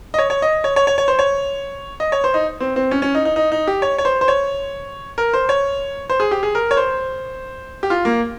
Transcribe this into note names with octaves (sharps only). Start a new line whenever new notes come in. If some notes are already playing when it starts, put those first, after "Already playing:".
D#5
C#5
C#5
D#5
C#5
C#5
C#5
C#5
C5
C#5
D#5
C#5
C5
D#4
C4
C4
C#4
C#4
D#4
D#4
D#4
D#4
G4
C#5
C#5
C5
C5
C#5
A#4
C5
C#5
C5
G#4
G4
G#4
A#4
C#5
C5
G4
F4
A#3